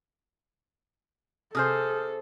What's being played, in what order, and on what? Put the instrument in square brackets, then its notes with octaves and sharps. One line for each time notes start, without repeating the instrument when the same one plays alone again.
[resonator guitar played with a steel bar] C3 G#4 C5 [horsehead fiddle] A4 [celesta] D#6 F6 G6